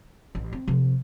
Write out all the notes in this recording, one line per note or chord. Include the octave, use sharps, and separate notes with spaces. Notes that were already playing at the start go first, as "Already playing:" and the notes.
A1
C4
C3 F3